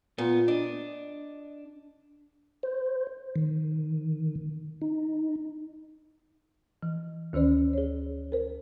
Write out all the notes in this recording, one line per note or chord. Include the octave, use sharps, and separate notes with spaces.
A#2 B3
D4 D#5
C5
D#3
D#4
E3
D2 D#3 C#4 C5 D5
G#4 C#5
A#4 C5